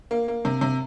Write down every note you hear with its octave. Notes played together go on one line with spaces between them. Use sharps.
A#3
A#3
C3
C3